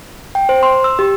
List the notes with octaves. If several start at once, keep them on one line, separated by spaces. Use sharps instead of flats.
G5
C5
C6
E6
G4